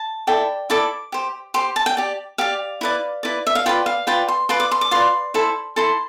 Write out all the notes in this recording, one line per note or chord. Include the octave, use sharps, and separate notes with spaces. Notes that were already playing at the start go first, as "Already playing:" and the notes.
Already playing: A5
E4 A4 D5 G5
E4 A4 D5 D6
G4 C5
G4 C5 C6
A5
G5
G4 D5
G4 D5 F5
E4 B4 D5
E4 B4 D5
E5
F5
F4 B4 D5 G5
F5
F4 B4 D5 G5
C6
F4 B4 D5 C6
D6
C6
D6
F4 B4 D5 C6
E4 A4 C5
E4 A4 C5 C6